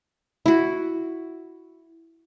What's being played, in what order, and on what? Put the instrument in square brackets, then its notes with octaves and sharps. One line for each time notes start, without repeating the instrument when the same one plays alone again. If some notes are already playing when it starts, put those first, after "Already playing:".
[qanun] E4 F#4